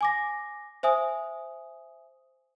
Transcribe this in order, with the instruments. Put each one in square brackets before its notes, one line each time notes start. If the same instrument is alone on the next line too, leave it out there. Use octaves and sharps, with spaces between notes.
[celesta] G#5 D6 A#6
C5 E5 G#5 D#6